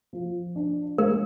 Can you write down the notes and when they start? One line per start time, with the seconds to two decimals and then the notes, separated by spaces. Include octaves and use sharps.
0.13 F3
0.56 D4
0.98 G#3 A#4